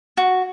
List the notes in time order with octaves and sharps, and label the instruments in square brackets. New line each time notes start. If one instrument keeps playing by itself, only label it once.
[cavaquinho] F#4